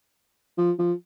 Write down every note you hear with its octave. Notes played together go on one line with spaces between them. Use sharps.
F3
F3